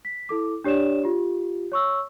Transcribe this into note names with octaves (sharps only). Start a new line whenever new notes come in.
B6
E4 A4 D6
D4 G4 C#5 D5 E7
F4 G4
C#5 C#6 E6